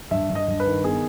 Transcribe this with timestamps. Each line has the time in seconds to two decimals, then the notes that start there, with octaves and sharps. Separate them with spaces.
0.11 G2 E5
0.30 G2
0.35 D#5
0.48 G2
0.60 B4
0.66 D#3
0.84 B3 G#4